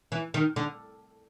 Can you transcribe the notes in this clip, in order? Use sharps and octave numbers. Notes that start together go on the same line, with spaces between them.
E3
D#3
D3